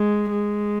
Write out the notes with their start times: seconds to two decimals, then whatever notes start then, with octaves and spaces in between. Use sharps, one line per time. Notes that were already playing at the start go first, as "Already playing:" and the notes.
Already playing: G#3
0.31 G#3